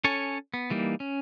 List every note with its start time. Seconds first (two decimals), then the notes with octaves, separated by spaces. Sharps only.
0.04 C#4 A4 C#5 G#5
0.54 B3
0.70 E3 G3 A#3 D#4
1.00 C#4